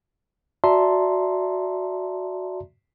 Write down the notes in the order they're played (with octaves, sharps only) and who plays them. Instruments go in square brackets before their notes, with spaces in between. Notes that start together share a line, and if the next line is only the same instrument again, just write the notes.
[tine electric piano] F#4 D5 E5 A5 A#5 C6